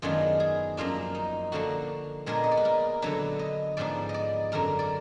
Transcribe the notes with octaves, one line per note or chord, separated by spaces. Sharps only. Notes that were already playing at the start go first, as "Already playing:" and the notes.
F#2 D#3 G#3 B3 D4 F4
G#4
F#2 F3 A#3 D4 F4
D#4
D3 F3 A#3 D4 F#4
A#2 G#3 B3 D4 A#4
D#5
D5
B4
A#4
D3 F#3 D4 B4
D#5
G#2 F3 B3 D4 D5
D#5
D5
F#2 D3 F#3 D4 A#4
D5